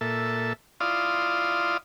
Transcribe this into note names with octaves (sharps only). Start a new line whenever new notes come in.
A#2 A4 E5
E4 F4 D5 F5 C6 D#6